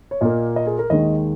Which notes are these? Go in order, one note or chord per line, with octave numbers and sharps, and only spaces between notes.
C#5
A#2 A#3 D#5
D#5
G#4
A#4
D#2 D#3 G#3 D#5